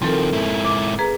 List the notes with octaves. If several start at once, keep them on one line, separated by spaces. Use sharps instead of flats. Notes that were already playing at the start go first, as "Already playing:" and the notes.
D#3 F3 C4 A4 A#4
G#2 E4
D6
G#4 B4 A#5